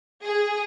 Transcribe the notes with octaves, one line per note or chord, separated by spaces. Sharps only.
G#4